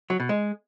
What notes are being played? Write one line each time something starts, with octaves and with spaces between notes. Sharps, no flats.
F#3
B2
G#3